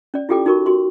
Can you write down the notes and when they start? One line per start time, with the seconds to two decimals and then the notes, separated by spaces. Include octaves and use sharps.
0.14 C#4 D5
0.29 E4 F4 G4 A4 G5 D6
0.46 D#4 F#4 A#4 C#6
0.66 F#4 C6